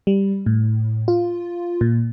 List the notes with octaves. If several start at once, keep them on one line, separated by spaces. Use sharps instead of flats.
G3
A2
F4
A#2